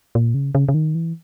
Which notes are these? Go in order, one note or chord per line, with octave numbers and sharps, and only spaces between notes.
A#2
C#3
C#3
C#3
D#3
E3